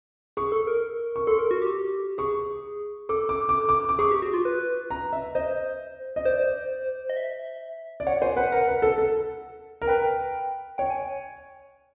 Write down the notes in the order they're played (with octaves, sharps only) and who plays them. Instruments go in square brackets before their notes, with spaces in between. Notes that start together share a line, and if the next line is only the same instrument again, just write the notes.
[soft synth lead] G#4 [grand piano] C#6
[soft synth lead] A4
A#4
[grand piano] C#6
[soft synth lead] A4 [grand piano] C6
[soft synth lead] A#4
F#4
G4
[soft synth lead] G#4 [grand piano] C#6
[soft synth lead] A4 [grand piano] D6
[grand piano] D6
D6
D6
D6
[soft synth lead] G#4 [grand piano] C#6
[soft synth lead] G4
F#4
F4
B4
[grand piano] A#5
E5
[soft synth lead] C5 [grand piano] D#5
[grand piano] D#5
[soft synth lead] C5 [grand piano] D5
[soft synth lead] D#5
E5
[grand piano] D5
[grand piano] C#5 [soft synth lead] F#5
[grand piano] C5 [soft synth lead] G#5
[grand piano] B4 [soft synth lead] F#5
[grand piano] A#4 [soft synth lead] F#5
[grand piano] B4
A4
A4
A#4
[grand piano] B4 [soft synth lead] G5
[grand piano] C#5 [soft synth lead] G5
[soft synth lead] G#5